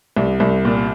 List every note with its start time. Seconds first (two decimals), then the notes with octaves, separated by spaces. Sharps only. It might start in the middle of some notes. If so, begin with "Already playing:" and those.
0.17 C2
0.40 C2
0.65 A#2